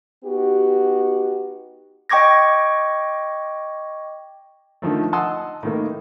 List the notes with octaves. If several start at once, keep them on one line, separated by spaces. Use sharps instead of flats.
B3 D#4 F#4 G4
D#5 G5 C#6 D6 G#6 A#6
D3 D#3 F3 A3
D#5 F#5 A5 C6 D#6 E6
A2 D#3 A#3